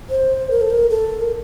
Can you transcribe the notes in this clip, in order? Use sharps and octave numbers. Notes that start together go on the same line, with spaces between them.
C5
A#4
A4
A#4
A4
A#4